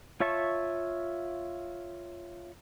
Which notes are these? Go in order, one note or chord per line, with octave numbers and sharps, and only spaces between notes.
F4 C#5 E5 A5 C#6